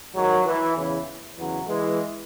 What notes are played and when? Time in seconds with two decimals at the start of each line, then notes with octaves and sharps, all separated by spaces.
0.15 G#2 D#3 F#3
0.45 E3
0.76 E2 C#3 E3
1.37 E2 C#3 E3 F#3
1.67 E3 G#3